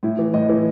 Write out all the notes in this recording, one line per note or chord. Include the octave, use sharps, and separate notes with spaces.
A2 E4
E3
A2 D#5
E3